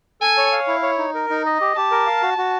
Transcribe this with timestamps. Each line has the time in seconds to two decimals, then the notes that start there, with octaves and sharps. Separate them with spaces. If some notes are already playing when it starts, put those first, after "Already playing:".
0.21 A4 G#5
0.37 C#5
0.52 F5
0.67 E4
0.82 C#5
0.98 D#4
1.14 A#4
1.30 D#4
1.46 D#5
1.61 G4
1.76 G4 A5
1.91 A#4
2.07 F5
2.22 F#4
2.38 F#4